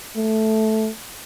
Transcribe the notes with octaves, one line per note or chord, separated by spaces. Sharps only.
A3